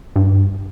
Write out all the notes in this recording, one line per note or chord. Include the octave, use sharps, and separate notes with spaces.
G2